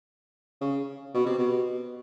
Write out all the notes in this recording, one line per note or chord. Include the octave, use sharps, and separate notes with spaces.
C#3
B2
C3
B2